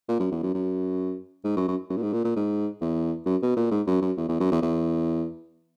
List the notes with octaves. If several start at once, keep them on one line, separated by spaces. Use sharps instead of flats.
A#2
F#2
E2
F#2
F#2
G#2
F#2
F#2
F#2
A#2
G#2
A#2
A#2
G#2
E2
F#2
B2
A#2
G#2
F#2
F#2
E2
E2
F#2
E2
E2